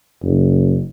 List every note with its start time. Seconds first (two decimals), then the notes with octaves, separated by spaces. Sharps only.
0.23 F#1